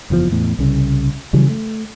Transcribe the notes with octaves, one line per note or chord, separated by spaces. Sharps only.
F#1 E2 A2 F3
E2 A2
C2 C#3
C#3 E3 F#3 G3
A3